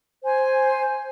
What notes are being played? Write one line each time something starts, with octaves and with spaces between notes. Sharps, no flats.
C5 G#5